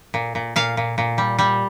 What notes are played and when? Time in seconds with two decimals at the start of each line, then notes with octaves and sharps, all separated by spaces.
0.14 A#2
0.35 A#2
0.56 A#2 F5
0.77 A#2
0.98 A#2
1.18 G3
1.39 G3